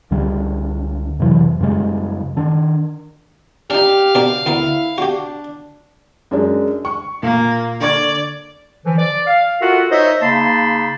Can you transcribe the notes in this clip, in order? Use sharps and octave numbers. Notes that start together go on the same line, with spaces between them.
C#2 D3 G3
F2 C3 E3 F#3
F#2 C#3 G3 G#3
D#3 D4
D4 D#4 G4 F5
B2 D4 A#4
D2 B3 E4 A#4
D4 F#4 G4
F#2 G#3 D4
C#6
A#2 A#3
D3 D5 C#6 G#6
D3 E3 F3
D5
F5
F4 F#4 A4 A#4 E5 F#5
D#4 C5 C#5 D#5 E5
C#3 A#3 D#4 A5 B5 C6